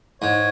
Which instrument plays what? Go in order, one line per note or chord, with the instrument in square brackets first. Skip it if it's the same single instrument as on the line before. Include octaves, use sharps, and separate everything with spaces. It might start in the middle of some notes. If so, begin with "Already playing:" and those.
[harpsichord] G#2 [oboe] C#5